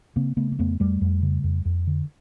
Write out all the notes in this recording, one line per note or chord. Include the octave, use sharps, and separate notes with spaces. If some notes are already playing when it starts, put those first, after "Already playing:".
C#3 A#3 C4
C#3 A3 B3
A#3
F2 A3 B3
F2 G3 A3
F2
C#3
F2
F2
D3